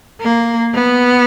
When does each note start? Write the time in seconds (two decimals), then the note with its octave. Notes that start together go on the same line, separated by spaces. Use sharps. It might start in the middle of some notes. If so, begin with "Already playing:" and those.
0.21 A#3
0.74 B3